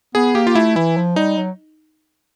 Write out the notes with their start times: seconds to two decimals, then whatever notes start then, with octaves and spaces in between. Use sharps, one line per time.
0.15 B3 G#4
0.35 A#3 G4
0.47 F4
0.55 A3 E4
0.76 E3 E4
0.97 F3
1.16 G3 D#4
1.37 F#3